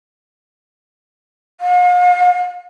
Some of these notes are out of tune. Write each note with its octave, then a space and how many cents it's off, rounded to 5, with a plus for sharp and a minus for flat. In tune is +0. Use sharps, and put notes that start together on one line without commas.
F5 +45